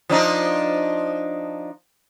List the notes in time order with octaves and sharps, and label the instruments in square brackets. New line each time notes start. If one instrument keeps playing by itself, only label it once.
[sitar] F3 D4 D#4